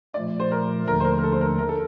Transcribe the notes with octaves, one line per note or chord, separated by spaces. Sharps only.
A#2 F3 A3 D5
C5
A#4
D#2 D3 F3 A3 D4 A#4
C5
A#4
A#4
A4
C5
A#4
A#4
A4